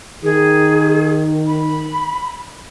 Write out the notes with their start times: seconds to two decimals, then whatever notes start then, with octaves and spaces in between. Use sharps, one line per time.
0.24 D#3 G#4
1.47 B5